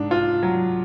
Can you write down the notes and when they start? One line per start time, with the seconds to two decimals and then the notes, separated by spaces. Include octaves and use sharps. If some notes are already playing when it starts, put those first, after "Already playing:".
Already playing: G#2 D4
0.11 F4
0.43 F#3